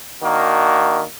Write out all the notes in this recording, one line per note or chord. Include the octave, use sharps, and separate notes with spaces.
D#3 A#3 D4 F#4